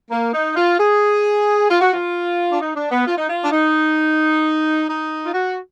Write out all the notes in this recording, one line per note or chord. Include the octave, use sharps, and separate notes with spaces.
A#3
D#4
F4
G#4
F4
F#4
F4
D4
D#4
D4
B3
F4
D#4
F4
D4
D#4
D#4
F4
F#4